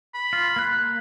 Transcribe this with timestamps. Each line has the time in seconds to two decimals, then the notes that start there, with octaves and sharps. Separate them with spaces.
0.14 B5
0.33 F4
0.56 A#3 F#6